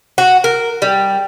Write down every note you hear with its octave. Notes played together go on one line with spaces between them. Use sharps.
F#4
A#4
G3